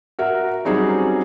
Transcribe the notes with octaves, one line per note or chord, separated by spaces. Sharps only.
F#4 A#4 E5
F#3 G3 C4 C#4 D#4 G#4